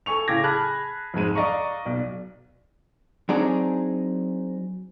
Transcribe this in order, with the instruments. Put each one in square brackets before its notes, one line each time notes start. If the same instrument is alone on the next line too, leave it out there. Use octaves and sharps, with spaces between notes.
[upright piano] A4 G#5 C#6 F7
A2 C#3 G5 D6 G#6 A#6
G#4 A5 B5 F6 F#6 G#6
F2 G#2 G#3 D#7
D5 D#5 F5 A#5 C#6
B1 D5
[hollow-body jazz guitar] F#3 C4 D4 D#4 G#4 D5